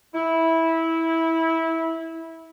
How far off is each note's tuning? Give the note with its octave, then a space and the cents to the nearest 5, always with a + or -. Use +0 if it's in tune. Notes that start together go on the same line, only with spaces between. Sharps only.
E4 -15